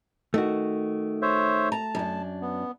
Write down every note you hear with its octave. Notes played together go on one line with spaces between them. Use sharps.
D#3 A3 F#4
C5 C#5 E5
A5 A#5
F#2 D4
B3